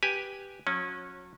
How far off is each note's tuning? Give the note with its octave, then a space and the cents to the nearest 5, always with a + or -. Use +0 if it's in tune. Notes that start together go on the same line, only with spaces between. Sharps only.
G4 +0 B4 +0 G#5 +0
F#3 -35 C#4 -15